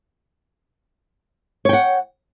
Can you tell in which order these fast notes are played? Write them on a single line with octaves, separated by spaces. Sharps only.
C#5 G5 F#5